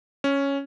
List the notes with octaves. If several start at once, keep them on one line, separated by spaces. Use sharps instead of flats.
C#4